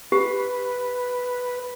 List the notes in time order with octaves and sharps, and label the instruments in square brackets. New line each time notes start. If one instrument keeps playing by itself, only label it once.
[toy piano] G4 [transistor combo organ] B4